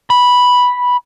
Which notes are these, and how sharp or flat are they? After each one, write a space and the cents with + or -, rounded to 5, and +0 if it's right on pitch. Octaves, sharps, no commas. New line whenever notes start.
B5 -5